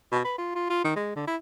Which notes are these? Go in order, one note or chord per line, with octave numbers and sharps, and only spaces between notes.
B2
B4
F4
F4
F4
D#3
G#3
D3
E4